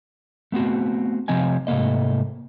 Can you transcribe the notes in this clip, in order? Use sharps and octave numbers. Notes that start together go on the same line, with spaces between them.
A3 B3 C4 F#4
C3 F3 C4 D#5 G#5
G#2 C3 A3 A#3 D#5